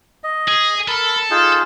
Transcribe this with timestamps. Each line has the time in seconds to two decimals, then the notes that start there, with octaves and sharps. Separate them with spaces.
0.24 D#5
0.48 G#4
0.88 A4 A#4 B5
1.30 D#4 F4 G#4